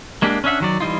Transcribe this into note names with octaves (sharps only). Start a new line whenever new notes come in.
G#3 A#3 D4 G4
C#4 D4 E5 F#5
D#3 F#3 D5
E3 G3 D#4 F4